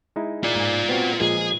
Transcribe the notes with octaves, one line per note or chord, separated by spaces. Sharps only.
G#3 D#4 E4
F4 D5
G#2
B3 C4 F#4
A#2 F3 G#3 G#4